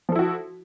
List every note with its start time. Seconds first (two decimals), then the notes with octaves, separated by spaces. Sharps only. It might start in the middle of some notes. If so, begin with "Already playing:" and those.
0.09 F3
0.12 A4
0.15 E4
0.19 F#4